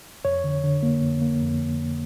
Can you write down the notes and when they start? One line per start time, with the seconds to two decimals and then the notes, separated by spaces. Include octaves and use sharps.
0.25 F2 C#5
0.44 D3
0.64 D3
0.83 A#3
1.02 F2
1.22 A#3
1.41 F2